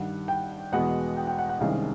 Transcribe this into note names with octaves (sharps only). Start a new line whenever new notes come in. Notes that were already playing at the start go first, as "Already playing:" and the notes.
Already playing: G2 D#3 G3 F#5
G5
E2 B2 G#3 B3 F#5
G5
G5
F#5
F#5
C2 C3 D#3 G#3 C#4 F5